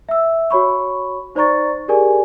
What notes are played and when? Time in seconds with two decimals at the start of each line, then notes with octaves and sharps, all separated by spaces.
0.09 E5 E6
0.50 F#4 C#5 B5 C#6
1.35 D#4 C5 D5 A#5 C#6 A6
1.88 G4 G#4 A#4 D5 G#5